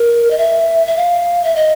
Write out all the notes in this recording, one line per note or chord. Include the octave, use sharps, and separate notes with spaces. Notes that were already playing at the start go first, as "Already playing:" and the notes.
Already playing: A#4
D#5
E5
E5
F5
E5
D#5